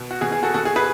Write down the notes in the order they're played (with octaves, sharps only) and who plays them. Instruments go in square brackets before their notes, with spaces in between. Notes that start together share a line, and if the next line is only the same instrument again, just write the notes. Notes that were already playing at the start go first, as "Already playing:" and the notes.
Already playing: [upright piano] B2
F#4
B2 G#4
G#4
F#4 A4
B2 F#4 A4
G#4
G#4 B4